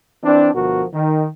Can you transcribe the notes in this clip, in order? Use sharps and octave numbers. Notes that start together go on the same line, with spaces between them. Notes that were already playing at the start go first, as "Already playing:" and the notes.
E3 C4 D4
D2 B2 F3 F#4 A#4
D#3